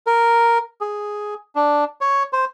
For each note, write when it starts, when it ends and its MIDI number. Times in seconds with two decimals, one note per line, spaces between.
0.07 0.58 70
0.81 1.34 68
1.55 1.84 62
2.01 2.23 73
2.33 2.45 72